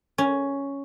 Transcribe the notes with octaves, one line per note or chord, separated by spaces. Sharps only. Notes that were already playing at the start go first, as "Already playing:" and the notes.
C#4